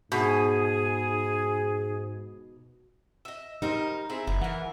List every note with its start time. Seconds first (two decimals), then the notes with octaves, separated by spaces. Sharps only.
0.12 G#2 B2 G#4
3.25 D#5 E5
3.62 G3 D#4 A#4 C5
4.09 C4 E4 G#4
4.27 F#1 E4
4.41 E3 A#4 F#5